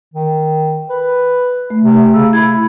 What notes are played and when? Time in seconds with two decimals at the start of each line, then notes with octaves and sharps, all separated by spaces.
0.14 D#3
0.90 B4
1.70 A3
1.84 C3
2.14 C#3 E6
2.33 E4 B5 G#6